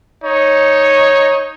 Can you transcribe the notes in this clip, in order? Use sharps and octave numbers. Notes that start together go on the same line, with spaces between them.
D#4 C#5